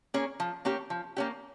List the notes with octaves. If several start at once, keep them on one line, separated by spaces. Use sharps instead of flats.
A#3 C#4 G#4
F3
A#3 C#4 G4
F3
A#3 C#4 G4